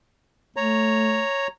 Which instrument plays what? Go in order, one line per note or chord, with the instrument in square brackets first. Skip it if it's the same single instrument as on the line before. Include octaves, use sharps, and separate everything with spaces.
[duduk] A3 [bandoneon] C#5 A#5